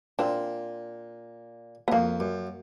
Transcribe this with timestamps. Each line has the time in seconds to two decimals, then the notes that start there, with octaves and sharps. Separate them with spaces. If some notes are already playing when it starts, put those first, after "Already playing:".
0.19 A#2 C4 D4
1.88 B3
1.92 F2 A#3
2.20 F#2